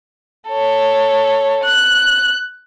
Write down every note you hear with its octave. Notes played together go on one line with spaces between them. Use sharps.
A4 C#5
F#6